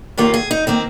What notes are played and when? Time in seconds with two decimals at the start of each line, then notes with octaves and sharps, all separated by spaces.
0.17 D#2 D#3 A#3 F4
0.34 G#4
0.51 D#4
0.67 D#3 A#3 C4